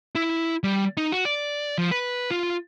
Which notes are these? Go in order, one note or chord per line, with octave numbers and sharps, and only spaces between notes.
E4
G3
D#4
F#4
D5
F3
B4
F4